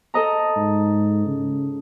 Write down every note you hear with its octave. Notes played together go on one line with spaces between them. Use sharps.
A4 D#5 A#5
G#2
C#3